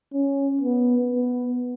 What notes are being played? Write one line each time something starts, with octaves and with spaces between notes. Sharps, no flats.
C#4
B3
B3